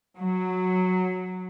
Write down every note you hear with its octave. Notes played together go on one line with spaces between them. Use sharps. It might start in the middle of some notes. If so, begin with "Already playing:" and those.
F#3